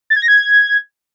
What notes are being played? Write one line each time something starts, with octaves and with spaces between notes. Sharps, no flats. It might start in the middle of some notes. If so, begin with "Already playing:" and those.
A6
G#6
A#6
G#6